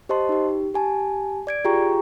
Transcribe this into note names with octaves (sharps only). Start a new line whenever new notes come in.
G4 C5 D#5 A5 C6
D#4 G4
G4 G#5 A5
D5 G#6 D7
F4 G4 G#4 G5 A#5 C#6